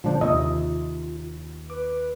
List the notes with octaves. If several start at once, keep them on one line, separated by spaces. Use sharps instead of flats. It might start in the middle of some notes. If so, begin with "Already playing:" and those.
A#2 D3 F3 G#3 D4 C5
D#2 C3 F4 D#5 E5
B4 D6